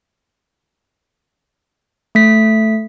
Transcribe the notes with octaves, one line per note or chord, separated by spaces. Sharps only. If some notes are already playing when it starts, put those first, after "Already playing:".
A3 B6